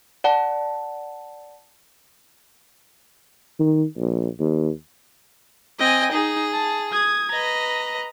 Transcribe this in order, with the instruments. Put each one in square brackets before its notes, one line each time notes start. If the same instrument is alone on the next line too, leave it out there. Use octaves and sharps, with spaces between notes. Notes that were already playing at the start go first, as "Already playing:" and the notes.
[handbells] D5 F#5 A5
[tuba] D#3
A#1
D#2
[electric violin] C4 G5 [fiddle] D#5 G#5
[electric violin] D#4 [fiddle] G#4
[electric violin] A5
D#6 G#6
[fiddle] B4 D#5 [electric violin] A#5